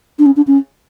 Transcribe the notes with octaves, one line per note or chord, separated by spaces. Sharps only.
D4
C#4
D4
C#4